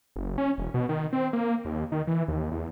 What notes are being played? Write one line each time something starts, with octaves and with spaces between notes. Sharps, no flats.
F#1
C#4
E1
B2
D#3
C4
A#3
D#2
D#3
E3
D#2
E2